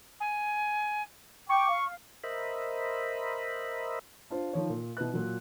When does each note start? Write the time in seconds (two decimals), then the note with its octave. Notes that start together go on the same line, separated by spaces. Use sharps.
0.20 G#5
1.49 G5 C#6 D6
1.68 F5
2.24 A#4 C5 D#5 E5 B5
4.30 D4 F4 C5
4.53 D#3 F3 C#5
4.70 A#2
4.97 B2 E4 B4 F#6
5.13 A#2 F#3